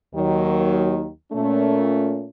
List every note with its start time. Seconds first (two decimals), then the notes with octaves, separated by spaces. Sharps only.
0.13 D#2 D#3 F#3
1.32 A#2 A3 C#4